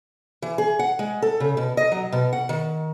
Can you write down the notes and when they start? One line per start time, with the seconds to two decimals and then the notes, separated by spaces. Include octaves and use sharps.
0.42 E3
0.58 G#4
0.79 F#5
0.99 G#3
1.22 A4
1.40 C#3
1.57 B2
1.77 D#5
1.92 F#3
2.12 B2
2.33 F#5
2.49 D#3